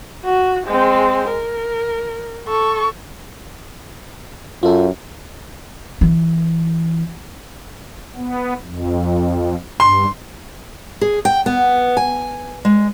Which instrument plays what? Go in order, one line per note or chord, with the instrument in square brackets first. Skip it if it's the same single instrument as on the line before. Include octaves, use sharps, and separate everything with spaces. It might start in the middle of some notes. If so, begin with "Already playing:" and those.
[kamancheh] F#4
G#3 C4
A#4
A4 C#6
[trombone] F#2 [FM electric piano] F4 A4
[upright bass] E3
[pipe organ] B3
F2
[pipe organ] G2 [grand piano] C6
[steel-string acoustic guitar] G#4
G5
B3
G#5
G#3